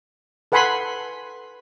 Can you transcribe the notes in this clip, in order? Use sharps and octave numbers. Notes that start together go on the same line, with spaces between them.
A4 B4 F#5 G#5 B5 C6